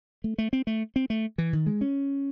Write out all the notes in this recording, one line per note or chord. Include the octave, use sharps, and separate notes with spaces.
A3
A3
C4
A3
C4
A3
E3
D#3
G#3
C#4